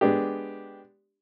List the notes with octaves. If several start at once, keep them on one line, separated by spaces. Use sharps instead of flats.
G#3 B3 D4 G4